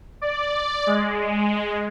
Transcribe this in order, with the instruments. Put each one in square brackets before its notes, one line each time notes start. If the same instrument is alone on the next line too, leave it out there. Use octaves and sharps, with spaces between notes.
[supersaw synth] D5
G#3